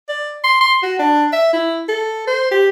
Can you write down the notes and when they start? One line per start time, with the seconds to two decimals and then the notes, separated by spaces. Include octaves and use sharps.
0.09 D5
0.44 C6
0.61 C6
0.83 F#4
0.99 D4
1.33 E5
1.53 E4
1.89 A4
2.28 C5
2.52 G4